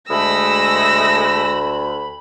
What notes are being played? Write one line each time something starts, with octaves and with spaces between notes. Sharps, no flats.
D2 G#3 A3 B5 E6 A#6